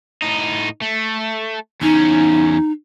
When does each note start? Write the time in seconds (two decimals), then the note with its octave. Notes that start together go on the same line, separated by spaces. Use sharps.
0.22 A2 D#4
0.82 A3
1.81 E2 C#4 D#4